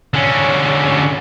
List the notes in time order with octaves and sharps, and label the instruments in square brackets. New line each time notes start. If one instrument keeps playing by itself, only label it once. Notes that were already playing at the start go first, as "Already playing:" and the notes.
[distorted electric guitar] D3 C#4